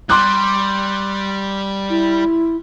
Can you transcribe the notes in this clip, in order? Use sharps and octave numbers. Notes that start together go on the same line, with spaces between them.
G3 C6 D6 F#6
E4